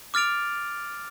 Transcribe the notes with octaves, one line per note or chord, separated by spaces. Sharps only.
D6 F6 A6 D7 F7